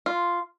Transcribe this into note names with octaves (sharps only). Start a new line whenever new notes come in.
F4